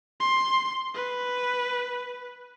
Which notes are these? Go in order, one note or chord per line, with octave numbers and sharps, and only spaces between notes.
C6
B4